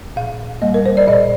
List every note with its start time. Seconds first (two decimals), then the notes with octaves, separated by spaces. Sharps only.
0.16 A#2 F5
0.62 G3 A#3 D#5
0.74 A#4
0.86 C5
0.97 D5
1.07 A#2 D#5